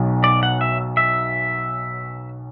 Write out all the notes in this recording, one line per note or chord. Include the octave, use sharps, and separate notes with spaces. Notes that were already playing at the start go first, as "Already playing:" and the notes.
Already playing: B1 B2 F#3
D5
F#5
E5
E5